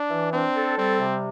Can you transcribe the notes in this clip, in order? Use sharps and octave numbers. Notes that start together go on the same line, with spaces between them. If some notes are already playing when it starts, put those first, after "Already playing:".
Already playing: D4
E3
C4 D4
A4
G3 C4
C3